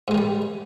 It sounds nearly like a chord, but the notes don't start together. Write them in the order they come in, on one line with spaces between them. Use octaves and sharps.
G#2 G#3 D#3 G3